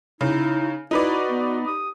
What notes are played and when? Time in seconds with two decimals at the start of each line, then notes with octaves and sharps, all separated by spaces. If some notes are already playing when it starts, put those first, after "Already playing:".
0.21 C#3 D#4 E4
0.91 D#4 E4 F#4 B4 D5
1.29 B3
1.67 G4 D#6